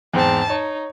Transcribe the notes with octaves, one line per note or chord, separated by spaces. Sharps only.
E2 G#2 C4 A5
D#4 C#5